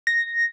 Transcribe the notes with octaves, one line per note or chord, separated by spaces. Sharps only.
A#6